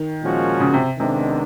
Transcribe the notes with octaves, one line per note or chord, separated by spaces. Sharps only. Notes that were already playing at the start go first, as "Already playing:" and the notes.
Already playing: D#3
A#2 F3 G#3 C#4 F#4
C#3
C3
C3 D#3 G#3 B3 D4